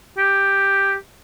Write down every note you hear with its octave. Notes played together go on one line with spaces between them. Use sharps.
G4